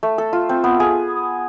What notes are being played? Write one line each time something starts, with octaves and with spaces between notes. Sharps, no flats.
A3
A4
F4
C4
B3
G#4